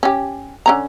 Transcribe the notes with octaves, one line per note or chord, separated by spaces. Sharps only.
C#4 G4
D3 C#4 A#5